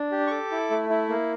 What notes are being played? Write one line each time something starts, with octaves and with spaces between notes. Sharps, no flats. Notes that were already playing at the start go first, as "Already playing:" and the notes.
Already playing: D4
G4
C#6
A4 D6
E4
A3
E4
A#3